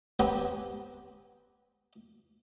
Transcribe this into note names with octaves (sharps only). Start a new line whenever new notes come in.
B3 C4 G4 C#5 G#5 A#5